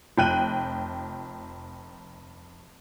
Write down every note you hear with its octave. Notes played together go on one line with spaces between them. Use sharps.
F1 F3 G5 F#6 D#7